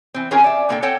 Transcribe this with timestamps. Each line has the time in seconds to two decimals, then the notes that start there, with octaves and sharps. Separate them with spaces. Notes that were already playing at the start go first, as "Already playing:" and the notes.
0.14 E3 C4
0.31 E3 C4 C#4 F4 G#4 A#4
0.44 D5 E5
0.69 A#2 D3 A#3 D4 A4 G5
0.82 C4 A4 C#5 F#5 G5 A5